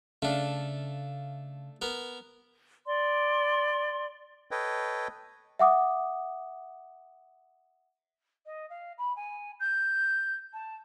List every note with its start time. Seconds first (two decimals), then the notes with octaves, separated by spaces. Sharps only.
0.22 C#3 A3 D4 F5
1.82 B3 A#4
2.87 D5 C6
4.51 A4 B4 C#5 D#5 G5
5.59 E5 F#5 D6 D#6
8.46 D#5
8.69 F5
8.98 B5
9.16 G#5
9.59 G6
10.53 A5